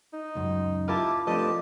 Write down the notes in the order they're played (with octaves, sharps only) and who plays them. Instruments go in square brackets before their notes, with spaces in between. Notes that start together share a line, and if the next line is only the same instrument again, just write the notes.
[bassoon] D#4
[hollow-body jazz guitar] C#2 F#2
[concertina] E4 G4 [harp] F4 A#4 A5
[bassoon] G2 [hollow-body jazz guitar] F3 A3 C4 [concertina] G4 A5 [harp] D#5